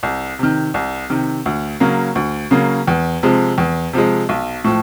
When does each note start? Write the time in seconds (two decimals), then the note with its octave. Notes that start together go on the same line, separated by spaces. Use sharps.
0.03 C2
0.39 C3 D#3
0.74 C2
1.10 C3 D#3
1.46 D2
1.80 C#3 F#3 A#3
2.15 D2
2.51 C#3 F#3 A#3
2.88 E2
3.23 C3 F3 G#3
3.58 E2
3.93 C3 F3 G#3
4.29 B1
4.64 A2 F3